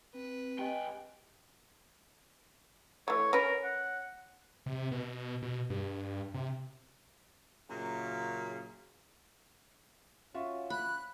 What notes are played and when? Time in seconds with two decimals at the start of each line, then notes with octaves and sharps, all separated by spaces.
0.14 C4 B4
0.59 C#2 G4 D#5 G5 G#5
3.08 E3 A3 C#5
3.33 C#4 A#4 B4
3.64 F#5
4.66 C3
4.91 B2
5.42 B2
5.70 G2
6.34 C3
7.69 F#2 A#2 C#3
10.34 C#4 F4 F#4 E5
10.70 F3 C#4 B5 F#6